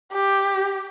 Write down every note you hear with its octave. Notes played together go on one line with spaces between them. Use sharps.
G4